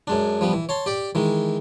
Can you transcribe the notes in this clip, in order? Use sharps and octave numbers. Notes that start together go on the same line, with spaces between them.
F#2 G#3 D4
F3 G3 B3
E3
C#5 A5 C6
G4 D5
D#3 E3 G#3